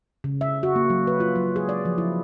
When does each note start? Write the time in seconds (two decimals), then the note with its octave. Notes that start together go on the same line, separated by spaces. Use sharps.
0.24 C#3
0.41 E5
0.63 F#4
0.76 A#3
0.90 F#3
1.07 B4
1.20 F4
1.36 F#3
1.56 G#4
1.69 D5
1.85 F3
1.98 E4